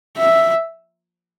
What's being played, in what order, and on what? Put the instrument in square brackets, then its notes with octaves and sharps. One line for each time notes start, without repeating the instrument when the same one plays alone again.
[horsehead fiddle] E5